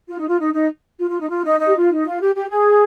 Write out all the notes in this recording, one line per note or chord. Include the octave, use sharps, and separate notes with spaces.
F4
D#4
F4
D#4
D#4
F4
F4
D#4
F4
D#4
D#4
G4
F4
D#4
F4
G4
G4
G#4